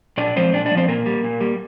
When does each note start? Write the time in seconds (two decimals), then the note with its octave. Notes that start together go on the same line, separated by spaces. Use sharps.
0.17 A#2 D4 D5
0.36 F3 G#3 C4 C5
0.53 A#2 D4 D5
0.65 D4 D5
0.71 G#3
0.75 F3 C4 C5
0.88 A#2 A#3 A#4
1.06 G3
1.24 A#2
1.41 G3